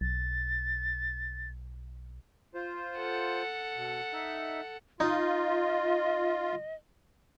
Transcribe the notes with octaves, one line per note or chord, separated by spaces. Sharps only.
B1 A6
F4 C5
A4 F#5
B2
D#4 E5
D#4 F4 D#5